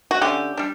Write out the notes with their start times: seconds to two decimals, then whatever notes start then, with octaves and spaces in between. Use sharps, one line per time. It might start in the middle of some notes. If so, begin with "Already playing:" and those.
0.11 F#4
0.21 D3 A3 C#4 G4
0.57 G3 D4